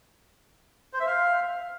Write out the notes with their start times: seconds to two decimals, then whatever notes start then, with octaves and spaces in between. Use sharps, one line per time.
0.93 C5
1.00 E5
1.06 F5